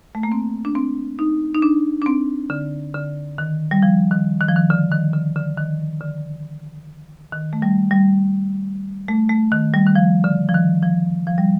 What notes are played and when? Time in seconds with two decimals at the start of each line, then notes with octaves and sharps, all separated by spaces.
0.15 A3
0.23 A#3
0.32 C4
0.65 D4
0.75 C4
1.19 D#4
1.54 D#4
1.62 D4
2.02 D4
2.06 C4
2.50 D3
2.94 D3
3.38 D#3
3.71 G3
3.83 F3
4.11 D#3
4.41 D#3
4.48 F3
4.56 D#3
4.70 D3
4.92 D#3
5.13 D3
5.36 D3
5.57 D#3
6.01 D3
7.32 D#3
7.53 A3
7.62 G3
7.91 G3
9.08 A3
9.29 A3
9.52 D#3
9.74 G3
9.87 D#3
9.95 F3
10.24 D3
10.49 F3
10.54 D#3
10.83 F3
11.27 F3
11.38 G3